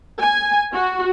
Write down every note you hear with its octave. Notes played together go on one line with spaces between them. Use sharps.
G#5
F#4